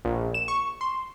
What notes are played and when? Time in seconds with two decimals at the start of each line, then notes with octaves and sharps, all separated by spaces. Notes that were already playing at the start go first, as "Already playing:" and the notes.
0.05 A#1
0.34 E7
0.48 C#6
0.81 C6